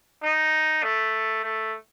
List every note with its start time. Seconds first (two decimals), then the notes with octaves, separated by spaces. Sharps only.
0.23 D#4
0.83 A3
1.44 A3